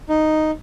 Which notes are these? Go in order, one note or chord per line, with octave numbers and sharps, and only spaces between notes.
D#4